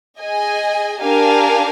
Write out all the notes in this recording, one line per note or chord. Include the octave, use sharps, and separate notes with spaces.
G#4 D#5 G#5
D4 G4 A#4 F5 G#5